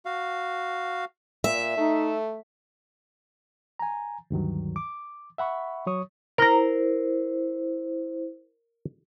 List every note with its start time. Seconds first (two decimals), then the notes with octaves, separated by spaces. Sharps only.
0.05 F#4 F5
1.44 A#2 E5
1.78 A3 D#4
3.79 G#5 A#5
4.30 D2 G2 D#3 F#3
4.76 D6
5.38 E5 F#5 B5 C#6
5.87 F#3 C#5 C#6 D#6
6.38 E4 A#4 C5 A#5